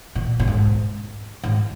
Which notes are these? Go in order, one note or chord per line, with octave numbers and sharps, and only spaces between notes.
A#2
A#2
G#2
G#2